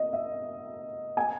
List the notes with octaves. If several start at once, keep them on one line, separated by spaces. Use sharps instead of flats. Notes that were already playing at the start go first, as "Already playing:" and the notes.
Already playing: D#5
E5
G#5